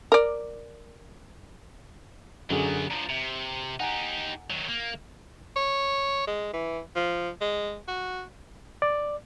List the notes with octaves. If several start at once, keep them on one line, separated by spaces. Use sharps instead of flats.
A#4 D5
F#2 D3 F#3 B3 G#4
D3 F3 A#5
C3
D#4 G4 F#5 G#5 A#5
D#3 F#3
A#3
C#5
G#3
E3
F3
G#3
F#4
D5